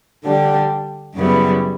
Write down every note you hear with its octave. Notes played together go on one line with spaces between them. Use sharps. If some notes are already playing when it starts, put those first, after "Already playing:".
D3 G3 D4 G4
F#2 C#3 G3 B3 E4